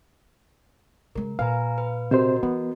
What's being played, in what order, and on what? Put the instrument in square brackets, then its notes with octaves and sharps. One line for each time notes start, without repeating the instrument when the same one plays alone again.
[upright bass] C#3 G#3 [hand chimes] A#4
[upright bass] A#2 [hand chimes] B4 G#5 A#5 [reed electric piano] F5
[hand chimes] B4
[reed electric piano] C3 C5 [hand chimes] F#4 A#4 D#5
[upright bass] E3 [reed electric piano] B3